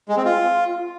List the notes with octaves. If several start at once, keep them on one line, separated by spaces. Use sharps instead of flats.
G#3
C4
F4